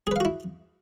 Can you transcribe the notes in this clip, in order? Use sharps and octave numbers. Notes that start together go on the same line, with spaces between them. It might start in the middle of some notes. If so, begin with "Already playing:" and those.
E4 F#4 G#4 B4 F5